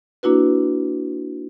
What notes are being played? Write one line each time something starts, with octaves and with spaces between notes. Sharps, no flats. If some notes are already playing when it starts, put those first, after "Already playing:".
A#3 D4 E4 F#4 B4